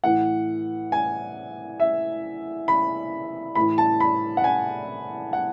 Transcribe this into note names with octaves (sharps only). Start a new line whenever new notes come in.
A2 E3 F#5
G#5
E5
B5
A2 E3 B5
A5
B5
F#5
G#5
F#5